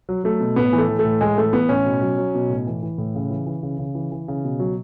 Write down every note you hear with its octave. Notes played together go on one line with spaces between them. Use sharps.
F#3
F#3 A3
B2
A2 B3
E3
A3
E3
A3
A2
A2 G#3
E3 A3
E3 B3
A2 C#4
B2
F#3
F#3
B2
A2
E3
E3
A2
C#3
E3
E3
C#3
C#3
E3
E3
C#3
B2
F#3